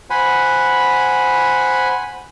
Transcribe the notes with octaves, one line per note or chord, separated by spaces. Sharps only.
C5 F#5 G#5 B5